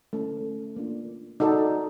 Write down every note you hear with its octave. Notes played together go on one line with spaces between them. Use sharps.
A3 C#4 E4
A#3 D4 F4
D#4 F#4 A4 D5